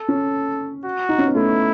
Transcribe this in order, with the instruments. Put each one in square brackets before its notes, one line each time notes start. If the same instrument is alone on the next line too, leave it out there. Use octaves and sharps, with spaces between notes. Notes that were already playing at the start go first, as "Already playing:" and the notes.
Already playing: [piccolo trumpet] A4
[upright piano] C#4
[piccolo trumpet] F#4
[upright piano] D#4
C#4
B3
[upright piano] A3 [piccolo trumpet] E4